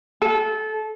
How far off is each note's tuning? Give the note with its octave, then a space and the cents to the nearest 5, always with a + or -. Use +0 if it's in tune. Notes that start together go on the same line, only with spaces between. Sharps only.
A4 -25